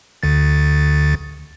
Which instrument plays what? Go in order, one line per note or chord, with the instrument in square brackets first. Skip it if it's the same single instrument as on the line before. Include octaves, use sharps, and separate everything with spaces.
[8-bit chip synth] D2 D3 A6